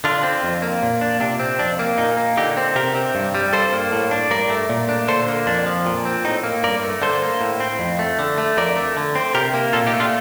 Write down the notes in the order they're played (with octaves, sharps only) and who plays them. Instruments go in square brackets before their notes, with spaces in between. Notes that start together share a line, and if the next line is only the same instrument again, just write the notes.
[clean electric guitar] D3 D4 F4
C4
F2
A#3
A#2
D4
C3 D4
C4
F2 D4
A#3
A#2 D#4
A#3
D3 D#4 G4
C4
C3 G4 A#4
C4
G2
G3
G2 A4 C5
A#3
A2
D4
G2 A#4 D5
A3
A#2
D4
D3 A4 C5
A#3
F2 D4
F3
A#2
C4
A2 D#4
A#3
G2 A#4 D5
A3
D3 A4 C5
A#3
A2
C4
F2
A3
D3
A3
F2 A#4 D5
A3
D3
C4
C3 G4 A#4
A#3
A#2 F4 A4
D#4 G4
A3
D4 F4